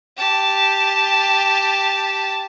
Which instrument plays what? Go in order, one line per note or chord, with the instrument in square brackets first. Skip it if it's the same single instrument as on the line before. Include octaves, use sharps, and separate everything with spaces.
[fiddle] G4 A5